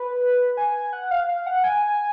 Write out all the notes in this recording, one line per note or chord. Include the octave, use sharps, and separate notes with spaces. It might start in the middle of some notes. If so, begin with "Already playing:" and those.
Already playing: B4
G#5
F#5
F5
F5
F#5
G#5